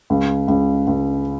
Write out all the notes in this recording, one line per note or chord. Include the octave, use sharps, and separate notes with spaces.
C#2
C#2
C#2